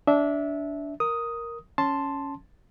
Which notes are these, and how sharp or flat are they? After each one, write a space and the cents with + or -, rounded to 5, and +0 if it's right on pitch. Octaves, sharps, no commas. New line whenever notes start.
D4 -20 E5 -15
A#4 +0 D#6 +5
C#4 +0 A5 +0 C6 +0